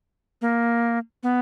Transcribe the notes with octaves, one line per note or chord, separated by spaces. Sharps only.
A#3
B3